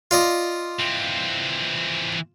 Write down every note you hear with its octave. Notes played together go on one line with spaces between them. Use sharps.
F4 D5 D#5
E3 C4